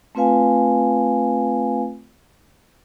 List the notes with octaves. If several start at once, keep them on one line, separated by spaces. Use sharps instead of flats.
A3 C4 F4 B4 F5 G#5